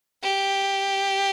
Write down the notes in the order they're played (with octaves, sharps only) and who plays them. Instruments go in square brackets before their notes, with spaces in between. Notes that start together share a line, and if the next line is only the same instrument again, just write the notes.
[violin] G4